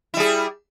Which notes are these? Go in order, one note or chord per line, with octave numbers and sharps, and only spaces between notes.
G3 E4 G#4